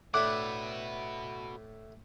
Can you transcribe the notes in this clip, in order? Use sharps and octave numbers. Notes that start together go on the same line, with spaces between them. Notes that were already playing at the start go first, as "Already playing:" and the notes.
A2 A3 D4 F#4 B4 D6 F#6